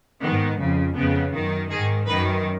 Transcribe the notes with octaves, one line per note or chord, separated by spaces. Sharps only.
G#2 D#3 B3
F2 C#3
F2 C#3 B3
F#2 D#3
G#2 D#3 G#4
F#2 D#3 B4